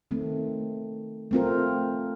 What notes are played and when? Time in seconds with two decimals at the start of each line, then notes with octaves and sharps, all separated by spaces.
0.11 D#3 A3 C4
1.31 A3 C4 F4 A#4